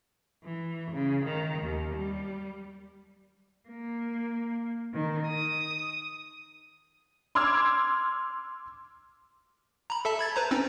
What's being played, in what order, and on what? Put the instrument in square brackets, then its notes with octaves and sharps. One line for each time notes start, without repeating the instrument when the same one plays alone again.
[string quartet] E3
C#3
D#3
D#2
G3
A#3
D#3
D#6
[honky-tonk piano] C6 D6 E6 F6 G#6
[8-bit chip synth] A#5 B5
A4 E5 A5
B5 G#6 A6
B4 C5 A#5
C4 C#4 D#4